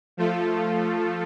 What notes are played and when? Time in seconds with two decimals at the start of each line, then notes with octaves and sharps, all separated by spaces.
0.17 F3 A3 F4 A4